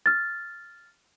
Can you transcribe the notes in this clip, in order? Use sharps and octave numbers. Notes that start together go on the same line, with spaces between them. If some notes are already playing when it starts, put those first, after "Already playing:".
F6 A6